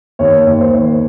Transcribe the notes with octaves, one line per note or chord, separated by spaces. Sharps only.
D#2 C#5
D#2
C5
D#2